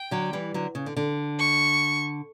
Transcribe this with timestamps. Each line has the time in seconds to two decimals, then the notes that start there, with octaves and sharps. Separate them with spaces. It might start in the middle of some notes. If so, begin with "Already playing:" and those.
Already playing: G5
0.11 D3 F#3
0.33 E3 G3
0.54 D3 F#3
0.75 C#3
0.86 D3
0.97 D3
1.39 C#6